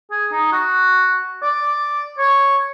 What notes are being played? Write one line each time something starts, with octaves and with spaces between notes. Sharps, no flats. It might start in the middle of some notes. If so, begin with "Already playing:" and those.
G#4
D#4
F#4
D5
C#5